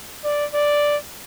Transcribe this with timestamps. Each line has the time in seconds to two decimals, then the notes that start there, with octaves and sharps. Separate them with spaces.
0.24 D5
0.54 D5